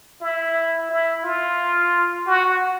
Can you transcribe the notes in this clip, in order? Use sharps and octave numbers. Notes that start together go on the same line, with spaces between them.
E4
E4
F4
F#4